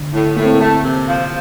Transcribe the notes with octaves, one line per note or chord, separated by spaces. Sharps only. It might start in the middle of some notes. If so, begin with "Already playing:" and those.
Already playing: D3
A2
A2 A#3
C4
A#3
A3
C3
F3